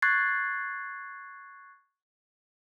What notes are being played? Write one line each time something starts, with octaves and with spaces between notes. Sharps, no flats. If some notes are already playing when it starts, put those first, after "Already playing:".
C#6 F#6 G#6 A6 C7